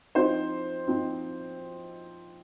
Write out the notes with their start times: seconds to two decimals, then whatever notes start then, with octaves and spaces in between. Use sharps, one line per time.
0.15 F3 C4 D#4 C5
0.87 F3 C4 D#4